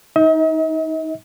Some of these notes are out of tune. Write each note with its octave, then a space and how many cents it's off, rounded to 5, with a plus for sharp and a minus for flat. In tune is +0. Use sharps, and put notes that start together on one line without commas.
D#4 +15 D#5 +45